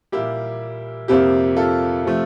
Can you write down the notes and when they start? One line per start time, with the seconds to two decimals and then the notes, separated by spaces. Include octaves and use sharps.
0.12 A#2 G3 A#3 E4 G4
1.08 F2 C3 F3 A#3 E4 G4
1.56 F4 A4
2.05 C3 F3 A3